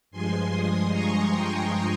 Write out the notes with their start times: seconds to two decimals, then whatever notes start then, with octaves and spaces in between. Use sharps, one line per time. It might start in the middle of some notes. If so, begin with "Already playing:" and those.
0.11 G2 F3 G#3 G#5 C6
0.50 C6 D#6
0.89 A#5 C#6
1.29 G5 A#5